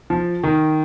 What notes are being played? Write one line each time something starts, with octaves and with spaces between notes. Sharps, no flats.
F3
D#3